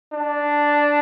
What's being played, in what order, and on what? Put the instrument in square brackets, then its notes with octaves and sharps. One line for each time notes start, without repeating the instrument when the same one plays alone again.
[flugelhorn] D4